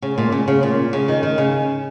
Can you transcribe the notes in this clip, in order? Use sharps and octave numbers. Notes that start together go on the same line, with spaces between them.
C#3
A#2
C#3
C#3
A#2
C#3
D#3
D#3
C#3